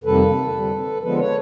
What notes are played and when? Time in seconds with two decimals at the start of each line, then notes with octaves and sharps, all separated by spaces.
0.04 F2 C3 D#3 G3 A#3 A4 B4
0.53 F2 D3 G3 C4
1.02 D3 F3 G#3 B3 A4 B4
1.19 B4 C#5